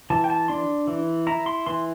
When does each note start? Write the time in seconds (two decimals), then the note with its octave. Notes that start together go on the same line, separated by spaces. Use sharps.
0.10 E3 A5
0.24 G5
0.30 A5
0.48 D4 C6
0.87 E3
1.27 E4 A#5
1.46 C6
1.66 E3 C6